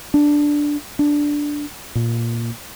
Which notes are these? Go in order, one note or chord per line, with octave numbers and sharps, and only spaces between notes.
D4
D4
A#2